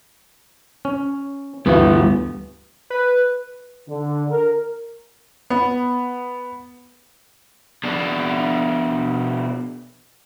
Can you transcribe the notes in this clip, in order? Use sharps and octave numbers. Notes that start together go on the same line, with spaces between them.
C#4
D2 G2 E3 G3 B3 F#4
B4
D3
A#4
B3
B2 D4